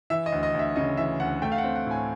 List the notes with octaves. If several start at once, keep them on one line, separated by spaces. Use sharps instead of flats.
E3 E5
D#5
D2
D#5
D2 E5
C#3 D#5
E3 E5
D2 F#5
A3 G5
F5
F#5
C4
F#5
A2 G#5